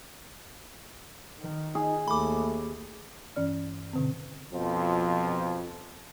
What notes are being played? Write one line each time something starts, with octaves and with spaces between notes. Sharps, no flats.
D#3
D#4 G#4
D#2 A3 B5 D6
G2 E3 C#4 D5 F6
B2 D3 C4
F2 B2 F3